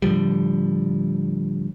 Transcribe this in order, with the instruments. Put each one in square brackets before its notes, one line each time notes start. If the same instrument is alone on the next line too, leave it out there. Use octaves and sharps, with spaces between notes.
[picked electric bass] A2 D3 F3 G3